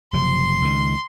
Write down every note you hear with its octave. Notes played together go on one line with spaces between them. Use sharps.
F#1 C3 F3 C6
C#2 D#3